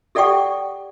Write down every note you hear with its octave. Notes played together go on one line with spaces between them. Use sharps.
G4 A4 D5 F#5 G5 C#6